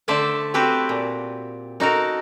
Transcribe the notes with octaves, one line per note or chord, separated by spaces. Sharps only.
D3 A3 C5 D5 E5 A5
C4 F#4 G4 A4 B4 C5
A#2
D#4 F#4 A4 A#4